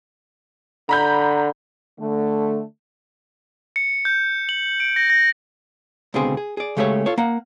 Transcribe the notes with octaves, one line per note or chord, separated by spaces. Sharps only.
D3 A#5 B5 G6
D3 A3
C#7
G6
F#7
D7
A#6
A#6
C#2 B2 D3 C4 G#4 C6
G#4
G#4 D5
C#3 G#3 A3 G4 A4 C#5
F4 A4 C#5
A#3 F#5